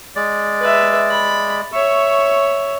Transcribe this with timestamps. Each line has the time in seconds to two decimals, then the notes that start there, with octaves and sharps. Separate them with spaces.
0.16 G#3 D5
0.61 B4 E5
1.10 B5
1.73 C#5 E5 C#6